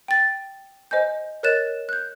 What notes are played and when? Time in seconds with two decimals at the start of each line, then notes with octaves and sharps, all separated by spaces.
0.08 G5 A6
0.91 C5 D#5 G#5 G6
1.43 A#4 C#5 D#5 F#6 A6 E7
1.89 F#6 G6